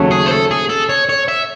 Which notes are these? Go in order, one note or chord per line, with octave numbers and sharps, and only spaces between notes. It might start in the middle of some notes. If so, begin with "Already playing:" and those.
Already playing: D#2 C#3 F#3 A3 C#4
G#4
C5
A4
G#4
A4
C#5
C#5
E5